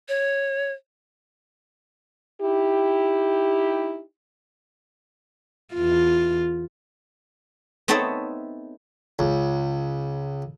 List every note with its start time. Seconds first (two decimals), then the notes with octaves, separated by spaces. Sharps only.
0.08 C#5
2.42 D#4 E4 G4
5.75 E2 F4
7.88 B3 C4 D#4 A4 C#5 E5
9.19 C#2